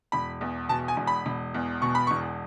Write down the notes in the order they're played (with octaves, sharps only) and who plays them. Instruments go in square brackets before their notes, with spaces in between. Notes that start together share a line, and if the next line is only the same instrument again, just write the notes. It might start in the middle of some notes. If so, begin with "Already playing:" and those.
[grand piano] E1 B5
E2
B2 A5
G#5
E1
B5
E1
E2
B2 C#6
B5
E1 C#6